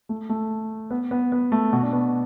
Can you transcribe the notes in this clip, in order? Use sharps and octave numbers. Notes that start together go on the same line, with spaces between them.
A3
A3
B3
B3
B3
A3
B2
D4
B3